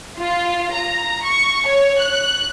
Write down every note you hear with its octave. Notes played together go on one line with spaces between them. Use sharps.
F4
A#5
C#6
C#5
F#6